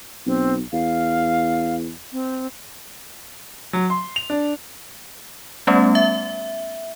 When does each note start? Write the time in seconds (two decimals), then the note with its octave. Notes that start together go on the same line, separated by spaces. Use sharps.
0.26 B1 C4
0.73 E2 F5
2.12 C4
3.73 F#3
3.90 C6
4.16 F7
4.30 D4
5.67 G3 A3 B3 C#4
5.95 E5